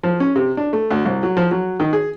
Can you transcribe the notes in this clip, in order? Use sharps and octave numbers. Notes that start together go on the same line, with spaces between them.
F3
C#4
C3
D4
A3
D2
C2
F#3
F3
F#3
D#3
G#4